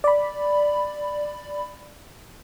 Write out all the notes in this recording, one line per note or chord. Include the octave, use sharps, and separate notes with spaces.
D5 B5